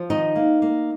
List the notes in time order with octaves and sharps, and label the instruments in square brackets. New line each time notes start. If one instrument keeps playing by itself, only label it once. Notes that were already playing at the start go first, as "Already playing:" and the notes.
Already playing: [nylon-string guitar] F3
D#3 D#4 D#5
A#3
A#3